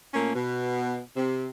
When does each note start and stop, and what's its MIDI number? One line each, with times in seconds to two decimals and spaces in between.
0.14 0.33 46
0.14 0.33 57
0.14 0.33 58
0.14 0.33 61
0.34 1.01 47
1.16 1.47 48